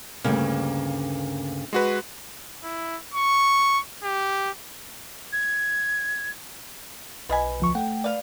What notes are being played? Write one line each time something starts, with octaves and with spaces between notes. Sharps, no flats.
D2 G2 C#3 A#3
G#3 F#4 B4
E4
C#6
G4
G#6
B1 F4 B4 D#5 G#5 B5
D2 F3 C#6
A3 F#5 G5
B4 D5 F5